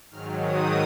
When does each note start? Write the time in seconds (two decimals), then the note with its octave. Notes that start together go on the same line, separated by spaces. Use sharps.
0.11 G#2 D#3 F#3 F6
0.41 D#6